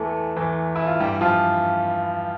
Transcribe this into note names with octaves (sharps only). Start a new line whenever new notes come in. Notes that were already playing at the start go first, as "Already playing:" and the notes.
Already playing: E2 E3 A3 A4
E2 E3
E4
F4
G2 E3 G3 G4
F3 F4